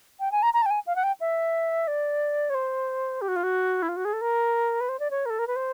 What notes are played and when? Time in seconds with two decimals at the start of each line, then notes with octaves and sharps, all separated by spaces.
0.20 G5
0.32 G#5
0.43 A#5
0.54 A#5
0.62 A5
0.66 G5
0.71 G#5
0.87 F5
0.96 F#5
1.03 G5
1.20 E5
1.88 D5
2.50 C#5
2.55 C5
3.21 G4
3.28 F#4
3.36 F4
3.43 F#4
3.82 E4
3.89 F4
3.97 F#4
4.05 G#4
4.13 A4
4.21 A#4
4.81 B4
4.89 C5
4.99 D5
5.11 C#5
5.26 A#4
5.30 A4
5.39 A#4
5.47 B4
5.56 C5